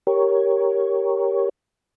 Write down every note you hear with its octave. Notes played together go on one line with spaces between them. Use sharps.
G4 A#4 C#5